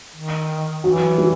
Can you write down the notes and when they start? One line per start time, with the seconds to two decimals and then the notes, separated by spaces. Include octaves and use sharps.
0.16 D#3
0.84 E3 F#3
1.18 G3